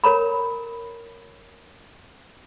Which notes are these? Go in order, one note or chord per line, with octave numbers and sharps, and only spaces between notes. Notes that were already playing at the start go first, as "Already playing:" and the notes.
A#4 C#5 A#5 B5